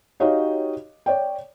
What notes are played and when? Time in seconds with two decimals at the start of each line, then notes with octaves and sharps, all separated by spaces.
0.20 D#4 F#4 G4 C#5 D#5 F5
1.06 C#5 D5 G5